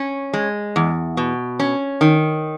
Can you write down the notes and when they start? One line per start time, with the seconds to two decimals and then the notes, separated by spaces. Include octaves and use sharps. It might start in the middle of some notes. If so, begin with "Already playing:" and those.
Already playing: C#4
0.33 G#3
0.76 E2
1.17 B2
1.60 C#4
2.01 D#3